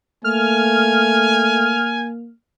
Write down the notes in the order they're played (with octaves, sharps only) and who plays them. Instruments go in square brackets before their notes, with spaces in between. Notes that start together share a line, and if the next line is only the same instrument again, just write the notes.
[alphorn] A3 [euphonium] A#3 [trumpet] G#5 [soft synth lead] F6